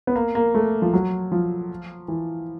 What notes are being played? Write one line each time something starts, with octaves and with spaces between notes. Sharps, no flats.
B3
A#3
A#3
A3
F3
F#3
F3
E3